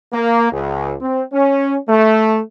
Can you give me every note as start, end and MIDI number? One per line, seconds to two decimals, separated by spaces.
0.13 0.51 58
0.52 0.94 37
1.01 1.22 60
1.33 1.77 61
1.89 2.40 57